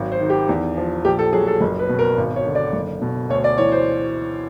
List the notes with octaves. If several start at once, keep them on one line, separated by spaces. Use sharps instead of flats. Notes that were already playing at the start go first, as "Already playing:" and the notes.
Already playing: G#1 F#3
C5
D#3
G4
E2
F3
A#1 G4
A4
F#3 G#4
A4
F#1
B4
B2
A#4
G#1
C#5
D3
D5
F#1
B2
D2 C#5
D5
E3 C#5
C5